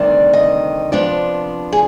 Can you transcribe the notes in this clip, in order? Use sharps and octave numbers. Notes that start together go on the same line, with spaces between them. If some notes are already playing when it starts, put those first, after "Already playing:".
Already playing: D2 C3 D#3 G3 D4
D#5
C3 F3 B3 D4 D5
G#4